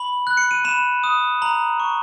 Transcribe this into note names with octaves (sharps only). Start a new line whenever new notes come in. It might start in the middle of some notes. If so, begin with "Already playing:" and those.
Already playing: B5 F#7
F#6
C#7
D#7
B5 E7
D#6
A#5 F#7
C#6